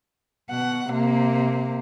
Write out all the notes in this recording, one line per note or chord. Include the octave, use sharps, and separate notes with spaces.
B2 F#5
C3 A#3